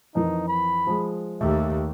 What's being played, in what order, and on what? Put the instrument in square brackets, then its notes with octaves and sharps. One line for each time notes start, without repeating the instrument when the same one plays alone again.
[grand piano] F2 E3 A#4 [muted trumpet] D#4
[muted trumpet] B5
[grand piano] F3 G#3
[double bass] D#2 [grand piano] A3 G4 [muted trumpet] E5